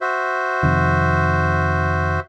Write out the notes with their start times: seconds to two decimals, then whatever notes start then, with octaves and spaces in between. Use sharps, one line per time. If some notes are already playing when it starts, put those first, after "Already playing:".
0.01 F#4 C5 E5
0.63 F2 C3 D#3